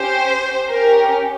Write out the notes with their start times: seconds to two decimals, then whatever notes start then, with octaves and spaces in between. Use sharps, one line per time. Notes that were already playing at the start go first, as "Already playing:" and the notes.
Already playing: C#4 G4 C5
0.70 C#4 G4 A#4